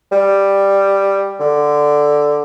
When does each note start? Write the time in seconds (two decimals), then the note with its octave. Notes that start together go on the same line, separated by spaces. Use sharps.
0.12 G3
1.40 D3